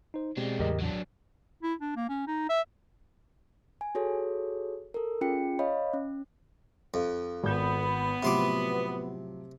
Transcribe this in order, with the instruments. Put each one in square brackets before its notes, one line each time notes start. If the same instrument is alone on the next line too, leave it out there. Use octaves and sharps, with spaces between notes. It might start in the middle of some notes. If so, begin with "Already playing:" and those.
[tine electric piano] D#4 C5
[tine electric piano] B2 C4 G4 [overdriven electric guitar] G#3 D4
[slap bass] E2 A2 C#3 [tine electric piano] G4 A#4 D#5
[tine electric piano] A#1 [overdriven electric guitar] F#3 D4
[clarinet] E4
D4
A#3
C#4
D#4
E5
[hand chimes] G#5
F#4 G#4 A4 C#5
A4 A#4
C#4 F4 G#4 G5 C#7
C#5 D#5 F5 B5
C#4
[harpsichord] F2 [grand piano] F5
[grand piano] G#1 G6 [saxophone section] B3
[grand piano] A2 F3 F#3 [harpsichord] C3 C6 D6